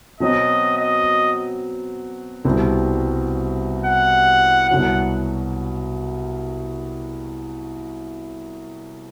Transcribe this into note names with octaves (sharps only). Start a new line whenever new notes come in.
B2 F#3 C4 D#5
D#5
C2 B2 G3 C4
F#5
C2 B2 F#3 F#5